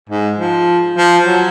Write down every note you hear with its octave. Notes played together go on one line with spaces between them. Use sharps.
G#2
F3
F3
F#3